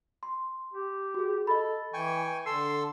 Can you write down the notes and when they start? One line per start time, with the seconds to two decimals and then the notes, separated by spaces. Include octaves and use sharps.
0.23 C6
0.74 G4
1.14 F#4 G#4
1.47 A4 D#5 B5
1.93 E3 G5 G#5 C#6
2.46 D3 A4 C6 E6 C7